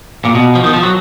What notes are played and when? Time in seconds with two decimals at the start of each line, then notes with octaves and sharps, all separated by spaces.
0.25 A#2
0.35 B2
0.55 F3
0.64 D#3
0.73 F3
0.83 F#3